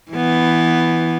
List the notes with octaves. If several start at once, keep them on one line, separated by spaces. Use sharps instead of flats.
E3 B3